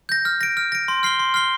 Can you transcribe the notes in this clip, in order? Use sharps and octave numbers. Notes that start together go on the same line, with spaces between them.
G6 A#6
F6
A#6 D7
F6
A#6 D7
C6
F6 C7 G7
C6
F6 C7 G7